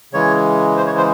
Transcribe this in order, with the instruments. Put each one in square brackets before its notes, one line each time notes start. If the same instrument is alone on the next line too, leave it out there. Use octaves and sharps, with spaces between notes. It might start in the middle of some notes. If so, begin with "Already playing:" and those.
[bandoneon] C#3 E3 G#3 C#5
C5
C#5
C5